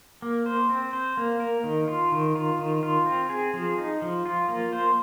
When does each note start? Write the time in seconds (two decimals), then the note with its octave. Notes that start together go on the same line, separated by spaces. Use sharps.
0.22 A#3
0.46 C5
0.69 C4
0.93 C5
1.17 A#3
1.40 A#4
1.64 D#3
1.88 F4
2.12 D#3
2.35 F4
2.59 D#3
2.83 F4
3.06 C4
3.29 G#4
3.54 F3
3.78 D#4
4.02 F3
4.26 F4
4.48 A#3
4.73 C5